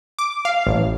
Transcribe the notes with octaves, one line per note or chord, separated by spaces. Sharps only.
D6
F5
A1